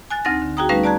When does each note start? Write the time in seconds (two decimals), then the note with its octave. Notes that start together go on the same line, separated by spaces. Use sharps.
0.10 G#5 F#6 A6
0.25 D2 C4 D#4 F6 A6 A#6
0.42 D3
0.57 F#4 G#4 G5 A#5 D#6
0.69 G3 A3 C#4 D#4 B4 F5
0.84 D5 A5 A#5 F#6 G#6